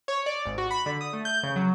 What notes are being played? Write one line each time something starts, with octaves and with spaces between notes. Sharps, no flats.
C#5
D5
G#1
F#4
B5
D3
D#6
A3
G6
C#3
F#3